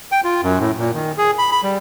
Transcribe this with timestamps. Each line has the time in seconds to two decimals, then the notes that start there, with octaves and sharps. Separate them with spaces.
0.12 G5
0.24 F4
0.43 F#2
0.60 A2
0.79 A#2
0.94 D#3
1.18 G#4
1.38 B5
1.52 B5
1.63 G3